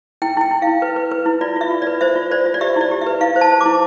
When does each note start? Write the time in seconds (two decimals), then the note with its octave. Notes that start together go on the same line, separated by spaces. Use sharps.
0.22 E4 G5
0.37 E4 G5
0.51 E4
0.62 F5
0.67 E4
0.82 B4
0.96 B4
1.11 B4
1.26 E4
1.41 F4 D5
1.56 F4 E5
1.71 F4
1.82 B4 D5
2.01 C5 E5
2.16 F4
2.31 C5 D5
2.46 F4
2.54 D5
2.61 G4 E5
2.76 E4 D5
2.91 G4
3.01 E5
3.06 B4
3.21 E4 F5
3.36 C5
3.41 A5
3.52 C5
3.61 D6
3.66 E4